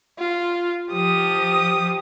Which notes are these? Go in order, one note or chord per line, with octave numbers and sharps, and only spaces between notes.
F4
F3 G4 D#6